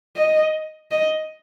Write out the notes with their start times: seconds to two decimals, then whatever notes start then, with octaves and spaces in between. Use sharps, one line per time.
0.17 D#5
0.91 D#5